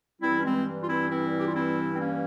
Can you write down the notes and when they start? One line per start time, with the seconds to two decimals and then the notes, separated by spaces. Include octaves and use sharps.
0.21 G2 E3 G3 C4 E4
0.40 C#4
0.44 G#3 C4
0.82 F4
0.88 C4 E4
1.10 C4 E4
1.38 G4
1.47 F4
1.55 C4 E4
1.95 C4
2.00 A#3 C#4